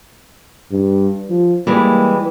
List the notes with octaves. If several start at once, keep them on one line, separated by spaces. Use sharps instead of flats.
G2
F3
E3 G3 G#3 A#3